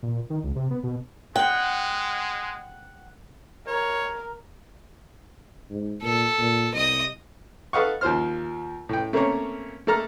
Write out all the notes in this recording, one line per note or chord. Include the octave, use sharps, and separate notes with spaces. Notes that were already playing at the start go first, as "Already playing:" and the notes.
A#2
D#3
C#2
C3
B3
B2
G#3 F#5 G5
A#4 C#5
G#2
A#2 A4
A#2
C2 D#5 D#6
A4 B4 D#5 F5 F#5 C#6
D#2 F3 C5 F6
A2 G5
A3 A#3 C4 C#4 A#4 C#5
A3 A#3 A4 A#5 F6